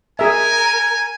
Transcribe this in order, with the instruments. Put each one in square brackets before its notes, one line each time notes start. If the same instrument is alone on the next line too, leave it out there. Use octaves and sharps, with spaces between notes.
[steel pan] G#4 E5 [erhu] A#4 [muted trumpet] G#5